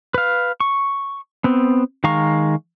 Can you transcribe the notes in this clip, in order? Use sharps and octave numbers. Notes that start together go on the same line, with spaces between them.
B4 F5
C#6
B3 C4
D#3 G#3 F5 A#5 C#6